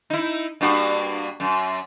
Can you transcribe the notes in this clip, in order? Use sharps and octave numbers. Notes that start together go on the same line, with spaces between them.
D#4 E4
G2 A#3 F#4
F#2